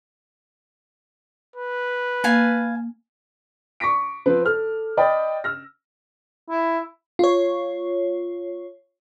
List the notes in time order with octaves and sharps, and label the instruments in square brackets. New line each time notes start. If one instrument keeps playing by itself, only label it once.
[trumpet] B4
[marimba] A#3 [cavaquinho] F5 G#5 A5
[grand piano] C#6 D6 A#6 B6 D7
F3 C4 B4
A4 F6
D5 D#5 G5 B5 D#6
E6 F6 A#6
[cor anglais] E4
[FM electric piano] F4 C#5